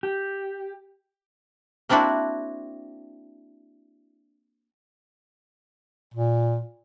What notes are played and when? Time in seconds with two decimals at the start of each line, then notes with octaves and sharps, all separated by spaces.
0.03 G4
1.89 A#3 C4 D4 E4 F#4
6.15 A#2